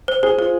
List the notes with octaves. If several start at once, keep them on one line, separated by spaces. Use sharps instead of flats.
C5
G#4 C5
F4 C5